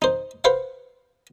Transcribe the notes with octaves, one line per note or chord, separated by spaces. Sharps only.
D#4 C5
B4 C5 F5 F#5